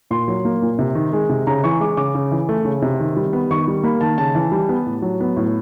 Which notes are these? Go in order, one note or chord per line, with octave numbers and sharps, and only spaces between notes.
A#2 C6
F#3
A#3
A#2
C3
D#3
G#3
C3
C#3 A#5
E3 C#6
G#3 D6
C#3 D6
C#3
E3
A3
C#3
C3
D#3
G3
B3
D#3 C#6
G3
A#3 B5
D#3 A5
C#3 A5
E3
G3
B3
A2
F#3
B3
A2